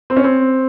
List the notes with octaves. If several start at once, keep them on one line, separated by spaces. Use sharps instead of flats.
C4
C#4
C4